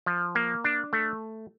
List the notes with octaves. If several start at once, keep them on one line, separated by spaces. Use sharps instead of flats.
F3
A#3
D4
A3